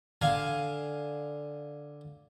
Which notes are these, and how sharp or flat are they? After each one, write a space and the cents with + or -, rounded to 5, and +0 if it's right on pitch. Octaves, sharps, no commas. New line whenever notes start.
D3 +0 F5 +0 G#5 +0